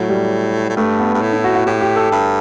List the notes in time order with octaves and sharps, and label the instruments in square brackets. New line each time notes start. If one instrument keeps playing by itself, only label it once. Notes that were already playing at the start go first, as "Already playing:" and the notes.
Already playing: [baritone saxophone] A2 [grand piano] F#3
[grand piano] G3
[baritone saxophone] A2
[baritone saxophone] G2 [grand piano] A3
[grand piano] B3
[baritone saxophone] G2
A2
[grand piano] E4
F#4
F#4
[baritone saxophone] A2 [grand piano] G4
[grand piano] G4
A4
[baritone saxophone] G2